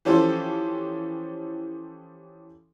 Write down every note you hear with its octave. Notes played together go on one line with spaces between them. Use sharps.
E3 F3 C#4 G4 A4 C5